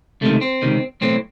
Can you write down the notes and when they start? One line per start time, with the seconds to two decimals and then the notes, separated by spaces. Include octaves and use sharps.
0.21 C#2 C3 D#3 A3
0.41 C4
0.62 C#2 C3 D#3
1.01 B1 A2 E3 C4